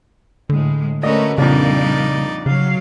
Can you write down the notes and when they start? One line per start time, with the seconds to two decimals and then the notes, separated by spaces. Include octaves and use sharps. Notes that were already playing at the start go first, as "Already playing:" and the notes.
0.50 A2 D3 G#3
1.03 A3 C#4 F#4 A#4 B4 D5 D#5
1.38 A#1 F2 A#2 C#3 G3 D4 D#4 D5
2.46 C#3 F#3 F5